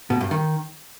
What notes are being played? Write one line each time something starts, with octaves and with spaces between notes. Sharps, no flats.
B2
G2
D#3